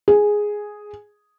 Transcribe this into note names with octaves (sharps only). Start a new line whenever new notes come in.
G#4